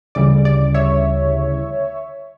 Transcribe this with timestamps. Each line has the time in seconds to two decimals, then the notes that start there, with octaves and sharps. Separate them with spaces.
0.15 D2 C#3 E3 G3 D5
0.45 D5
0.74 C#5 E5